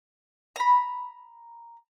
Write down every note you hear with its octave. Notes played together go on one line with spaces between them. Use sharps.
A#5 B5